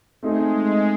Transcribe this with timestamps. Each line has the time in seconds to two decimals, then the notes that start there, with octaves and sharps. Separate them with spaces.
0.23 G#3 A3 C4 D#4 G#4